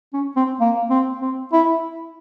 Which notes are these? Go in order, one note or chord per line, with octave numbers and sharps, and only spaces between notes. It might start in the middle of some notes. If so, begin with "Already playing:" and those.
C#4
C4
A#3
C4
C4
E4